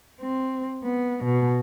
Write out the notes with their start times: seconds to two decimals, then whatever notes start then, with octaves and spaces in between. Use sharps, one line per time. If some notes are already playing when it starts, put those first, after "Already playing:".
0.21 C4
0.84 B3
1.24 B2